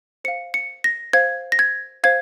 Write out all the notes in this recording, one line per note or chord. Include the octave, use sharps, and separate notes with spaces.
C5 F5 C#7
C#7
A#6
C5 F5 G#6
A#6
G#6
C5 F5 G#6